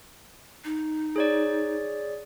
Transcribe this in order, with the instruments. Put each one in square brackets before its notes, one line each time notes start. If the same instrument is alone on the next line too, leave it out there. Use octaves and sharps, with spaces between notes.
[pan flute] D#4
[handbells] G#4 C#5 D5